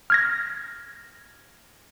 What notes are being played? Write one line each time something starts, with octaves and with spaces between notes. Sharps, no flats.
F6 G#6 A#6